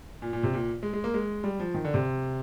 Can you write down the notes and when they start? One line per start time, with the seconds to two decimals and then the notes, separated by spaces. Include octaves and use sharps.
0.22 A#2
0.33 A#2
0.43 C3
0.53 A#2
0.83 G#3
0.93 G#3
1.04 A#3
1.14 G#3
1.44 G3
1.60 F3
1.74 D#3
1.84 D3
1.94 C3